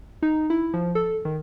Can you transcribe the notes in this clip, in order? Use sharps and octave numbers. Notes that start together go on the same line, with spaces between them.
D#4
E4
F3
A4
D#3